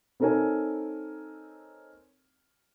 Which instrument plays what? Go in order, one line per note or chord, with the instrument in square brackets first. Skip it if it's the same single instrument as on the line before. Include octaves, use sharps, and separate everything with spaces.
[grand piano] C4 D#4 A4 A#4 C#5 G#5